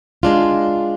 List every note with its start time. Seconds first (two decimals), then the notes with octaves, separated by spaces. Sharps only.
0.23 G#3 D4 F4